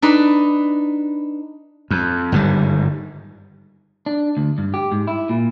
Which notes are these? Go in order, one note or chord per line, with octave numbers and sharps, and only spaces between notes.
D4 D#4 B4
F2
G1 G#2 D#3 G3
D4
D2
G2
G4
G#2
E4
A#2